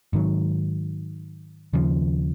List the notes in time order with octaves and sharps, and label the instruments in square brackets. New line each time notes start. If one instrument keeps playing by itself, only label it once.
[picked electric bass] G#2 D#3 F#3
D#2 C#3 F3